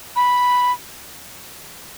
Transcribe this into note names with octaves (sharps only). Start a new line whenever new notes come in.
B5